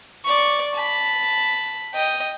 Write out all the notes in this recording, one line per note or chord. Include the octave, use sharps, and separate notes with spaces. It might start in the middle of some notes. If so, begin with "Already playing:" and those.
D5 C#6
A5 B5
D#5 G5